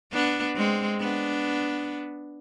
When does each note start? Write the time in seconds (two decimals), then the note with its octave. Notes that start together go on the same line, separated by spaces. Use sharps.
0.12 B3 D4
0.56 G#3 C4
1.00 B3 D4